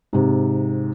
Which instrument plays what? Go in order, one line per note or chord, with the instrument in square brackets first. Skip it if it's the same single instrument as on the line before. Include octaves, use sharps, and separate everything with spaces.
[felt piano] G#2 C3